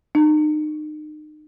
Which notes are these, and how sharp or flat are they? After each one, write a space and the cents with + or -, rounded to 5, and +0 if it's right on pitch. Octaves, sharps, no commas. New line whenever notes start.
D#4 -35